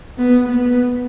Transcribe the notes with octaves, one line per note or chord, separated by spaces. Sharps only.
B3
B3